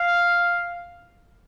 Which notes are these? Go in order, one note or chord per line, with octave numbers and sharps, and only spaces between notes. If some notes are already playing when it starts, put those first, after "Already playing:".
Already playing: F5